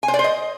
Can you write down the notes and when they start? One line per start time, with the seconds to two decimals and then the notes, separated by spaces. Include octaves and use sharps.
0.03 G#5
0.08 C5
0.14 D5
0.19 C5
0.24 D#5